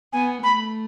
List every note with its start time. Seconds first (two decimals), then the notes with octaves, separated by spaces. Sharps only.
0.13 B3 G#5
0.43 A3 B5